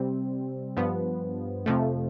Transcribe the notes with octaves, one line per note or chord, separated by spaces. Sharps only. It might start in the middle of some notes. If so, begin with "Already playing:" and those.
Already playing: C3 G3 C4
G2 F3 B3
F2 C3 F3 A3